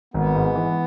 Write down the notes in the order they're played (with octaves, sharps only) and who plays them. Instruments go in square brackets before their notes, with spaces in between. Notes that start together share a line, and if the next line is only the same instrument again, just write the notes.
[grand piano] G#1 [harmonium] B3
[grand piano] G#2
E3